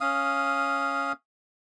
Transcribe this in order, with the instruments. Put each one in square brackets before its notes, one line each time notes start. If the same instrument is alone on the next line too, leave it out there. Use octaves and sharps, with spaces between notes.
[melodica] C#4 F5 D#6